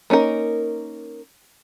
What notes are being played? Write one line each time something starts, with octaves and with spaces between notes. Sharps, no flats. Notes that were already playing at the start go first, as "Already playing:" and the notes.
A#3 C#4 D#4 A#4